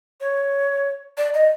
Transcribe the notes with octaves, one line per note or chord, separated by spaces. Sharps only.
C#5
D5
D#5